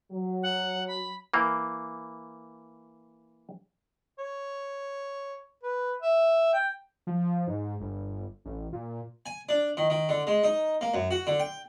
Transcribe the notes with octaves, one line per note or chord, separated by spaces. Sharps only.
F#3
F#5
B5
E3 A#3
C#5
B4
E5
G5
F3
G#2
G1
A1
A#2
G#5
D4
D#3
D#3
D3
G#3
D#4
A#3
F#2
F#4
D3
G5